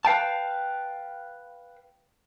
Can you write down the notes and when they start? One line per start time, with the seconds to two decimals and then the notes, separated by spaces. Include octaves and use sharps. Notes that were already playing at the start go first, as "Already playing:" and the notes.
0.05 B4 F5 G5 A5